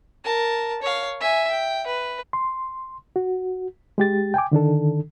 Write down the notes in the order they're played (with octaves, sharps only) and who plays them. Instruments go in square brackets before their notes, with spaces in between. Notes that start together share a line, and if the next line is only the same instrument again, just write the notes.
[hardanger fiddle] A#4 A5
C#5 F5
E5 G#5
G5
B4
[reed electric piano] C6
F#4
G#3 G4 A6
G5 G#5 D6
D3 D#3 D4 A4